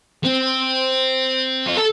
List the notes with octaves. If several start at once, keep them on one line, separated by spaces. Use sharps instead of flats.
C4
F4
A4